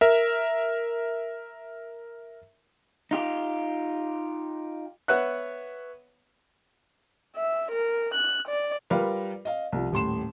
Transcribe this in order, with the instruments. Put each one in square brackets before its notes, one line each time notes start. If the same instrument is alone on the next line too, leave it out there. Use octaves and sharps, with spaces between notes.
[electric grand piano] A#4 E5
[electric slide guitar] D#4 F4 G4
[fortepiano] B3 B4 C#5 E5 F#5 F#6
[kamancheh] E5
A#4
F#6
D5
[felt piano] G3 F4 A#4 B4 F5
D#5 F5
C2 F3
D#1 A2 C6 E7